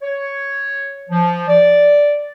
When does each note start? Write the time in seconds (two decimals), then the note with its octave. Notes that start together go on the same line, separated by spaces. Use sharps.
0.02 C#5
1.10 F3
1.48 D5